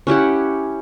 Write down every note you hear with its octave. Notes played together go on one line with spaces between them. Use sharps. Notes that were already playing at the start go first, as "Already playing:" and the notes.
C#4 E4 G4 F#5